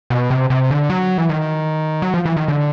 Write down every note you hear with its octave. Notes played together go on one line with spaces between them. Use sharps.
B2
C3
C3
D3
F#3
E3
D#3
F#3
F3
E3
D#3
D3